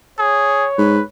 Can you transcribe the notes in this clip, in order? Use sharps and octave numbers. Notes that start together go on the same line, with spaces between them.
G#4 C#5
G#2 B4